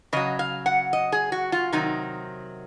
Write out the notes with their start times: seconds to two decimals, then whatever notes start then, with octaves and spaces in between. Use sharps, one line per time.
0.13 C#3 F#3 D#5
0.39 F5
0.66 F#5
0.93 D#5
1.12 G#4
1.32 F#4
1.52 F4
1.72 C3 D#3 F#3 D#4